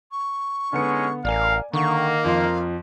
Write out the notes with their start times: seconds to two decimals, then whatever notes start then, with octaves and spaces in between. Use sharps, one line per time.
0.11 C#6
0.73 D3 G#3 B3 C#4 D#4 C#7
1.25 A1 A#4 D5 F5 G#5
1.73 D3 D#3 A#3 C#6
2.24 F2 F3 F5 C6